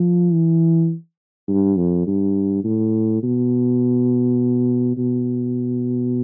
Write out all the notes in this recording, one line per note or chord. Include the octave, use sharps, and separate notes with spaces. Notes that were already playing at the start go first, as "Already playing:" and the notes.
Already playing: F3
E3
G2
F2
G2
A2
B2
B2